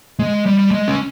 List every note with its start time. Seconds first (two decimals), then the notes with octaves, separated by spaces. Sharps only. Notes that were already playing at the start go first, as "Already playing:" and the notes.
0.19 G#3
0.46 G3
0.59 G3
0.71 G#3
0.88 C#4